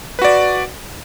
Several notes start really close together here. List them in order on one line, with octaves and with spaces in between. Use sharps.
B4 F#4 D5